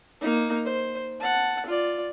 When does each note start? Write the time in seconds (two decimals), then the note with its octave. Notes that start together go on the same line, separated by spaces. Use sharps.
0.21 A#3 D#4
0.65 C5
1.20 F#5 A5
1.66 F4 D5